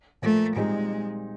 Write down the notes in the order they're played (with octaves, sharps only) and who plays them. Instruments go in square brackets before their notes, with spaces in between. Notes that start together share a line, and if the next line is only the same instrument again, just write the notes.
[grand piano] A#2 F3 A#3 [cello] A3
[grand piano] A#2 G3 C4 D#4 G#4 [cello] G#3